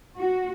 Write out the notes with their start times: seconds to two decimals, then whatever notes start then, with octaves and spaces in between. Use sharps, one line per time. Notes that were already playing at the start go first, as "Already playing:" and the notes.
0.18 F#4